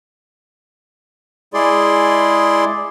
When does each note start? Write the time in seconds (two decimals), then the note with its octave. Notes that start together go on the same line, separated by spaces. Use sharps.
1.54 G#3 E4 G#4 D5 C6